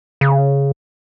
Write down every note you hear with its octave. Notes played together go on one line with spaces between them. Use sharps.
C#3